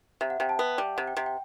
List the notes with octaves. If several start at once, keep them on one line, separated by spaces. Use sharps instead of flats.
C3 E5
F#5
C3 G5
A5
B3
G3
C3 F#5
G5
C3
G5